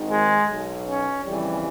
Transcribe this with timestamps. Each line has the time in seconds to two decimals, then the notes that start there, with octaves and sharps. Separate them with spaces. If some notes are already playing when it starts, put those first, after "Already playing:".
Already playing: G#1 G#2 D#3
0.09 G#3
0.47 B1 B2
0.86 C#4
1.24 F2 C#3 E3 G3